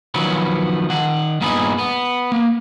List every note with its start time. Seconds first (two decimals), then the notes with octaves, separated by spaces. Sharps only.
0.14 D#3 F3 F#3 B3 B4
0.90 D#3 F#5
1.41 G2 A#2 B3 D#4 G#4 B5
1.78 B3
2.32 A#3